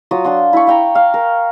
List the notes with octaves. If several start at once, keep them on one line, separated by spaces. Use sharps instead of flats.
F#3 F4 D#6
D4 F4 F#5 C6
E4 B5 C#6
F5 G5 A#5
F5
A#4